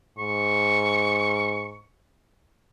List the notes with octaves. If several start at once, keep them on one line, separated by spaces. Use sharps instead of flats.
G#2 C#6